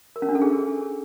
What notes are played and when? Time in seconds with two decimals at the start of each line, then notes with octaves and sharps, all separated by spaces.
0.16 A#4
0.22 C#4
0.29 D4
0.35 A4
0.42 G#4